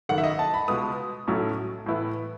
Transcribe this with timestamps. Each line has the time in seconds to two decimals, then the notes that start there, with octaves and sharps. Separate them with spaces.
0.09 G#1 F#2 D#3 F#5
0.18 E5
0.24 D#5
0.39 A5
0.54 B5
0.68 C#2 B2 G#3 B3 D#6
1.27 B1 A2 F#3 A3 C#4
1.86 A2 E3 B3 E4